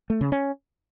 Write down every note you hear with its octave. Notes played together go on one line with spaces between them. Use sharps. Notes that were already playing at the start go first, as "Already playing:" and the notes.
A3
C#3
C#4